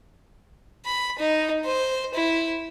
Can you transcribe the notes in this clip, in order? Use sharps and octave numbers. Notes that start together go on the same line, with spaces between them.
B5
D#4
C5
E4